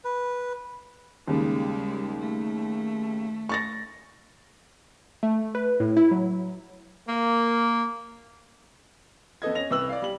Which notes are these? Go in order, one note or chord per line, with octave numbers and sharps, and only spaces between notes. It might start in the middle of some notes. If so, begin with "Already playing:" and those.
B4
D#2 C#3 G3 G#3
A3
C#6 A6 A#6
A3
B4
A2
E4
F#3
A#3
F2 B3 A4 D#5 G#6
C#4 A#6 F7
C2 B4 E6 F#7
D5 F5
G3 F#7